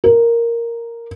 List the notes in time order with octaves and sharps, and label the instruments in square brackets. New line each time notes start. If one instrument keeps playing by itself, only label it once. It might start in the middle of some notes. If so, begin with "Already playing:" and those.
[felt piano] A#4